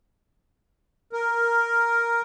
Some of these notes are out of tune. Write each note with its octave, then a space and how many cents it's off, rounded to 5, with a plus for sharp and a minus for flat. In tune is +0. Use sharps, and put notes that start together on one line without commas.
A#4 +0